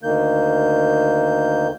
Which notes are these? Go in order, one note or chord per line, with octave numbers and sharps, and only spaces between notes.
D2 D#3 A#3 G6